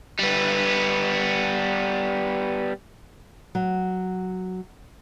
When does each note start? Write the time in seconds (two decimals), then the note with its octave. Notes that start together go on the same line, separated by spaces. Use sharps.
0.19 G3 B3
3.55 F#3